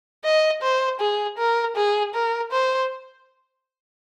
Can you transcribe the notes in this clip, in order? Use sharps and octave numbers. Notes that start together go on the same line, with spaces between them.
D#5
C5
G#4
A#4
G#4
A#4
C5